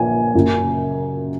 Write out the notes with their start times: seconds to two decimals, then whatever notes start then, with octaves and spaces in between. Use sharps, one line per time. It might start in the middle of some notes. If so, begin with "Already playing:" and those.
Already playing: A#1 A#2 G#5
0.34 F#1 F#2 C#3